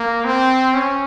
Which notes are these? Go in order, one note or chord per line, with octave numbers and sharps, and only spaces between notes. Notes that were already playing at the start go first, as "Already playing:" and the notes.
Already playing: A#3
C4
C#4